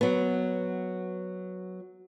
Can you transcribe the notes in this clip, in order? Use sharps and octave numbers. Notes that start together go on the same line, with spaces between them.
F#3 B3